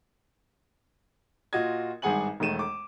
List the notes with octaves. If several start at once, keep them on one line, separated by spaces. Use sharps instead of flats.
A#2 F4 F#4 D#5 G#6
G#1 G2 G#4 F#5 G#5 F#7
E1 D#3 A3 D#7 E7
D6